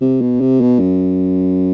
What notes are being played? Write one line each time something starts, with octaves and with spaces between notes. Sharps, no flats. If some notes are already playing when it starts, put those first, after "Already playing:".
C3
B2
C3
B2
F#2